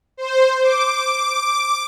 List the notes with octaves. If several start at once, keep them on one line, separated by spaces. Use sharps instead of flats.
C5
D6